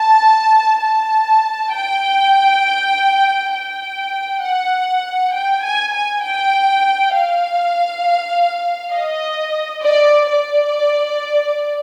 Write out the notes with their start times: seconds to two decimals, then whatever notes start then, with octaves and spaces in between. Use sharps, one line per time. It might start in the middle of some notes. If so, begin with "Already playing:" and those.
Already playing: A5
0.81 A5
1.72 G5
3.53 G5
4.43 F#5
5.33 G5
5.63 G#5
5.92 G#5
6.23 G5
7.14 F5
8.94 D#5
9.83 D5
10.30 D5